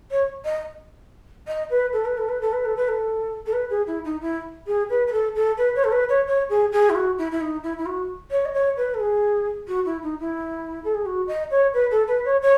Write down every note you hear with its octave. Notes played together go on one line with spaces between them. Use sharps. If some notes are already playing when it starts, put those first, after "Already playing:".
C#5
D#5
D#5
B4
A4
B4
A4
B4
A4
B4
A4
B4
A4
A4
B4
G#4
E4
D#4
E4
G#4
B4
B4
A4
A4
B4
C#5
A4
B4
C#5
C#5
G#4
G#4
E4
F#4
E4
E4
D#4
E4
E4
F#4
C#5
D#5
C#5
B4
A4
G#4
F#4
E4
D#4
E4
A4
G#4
F#4
D#5
C#5
B4
A4
B4
C#5
C#5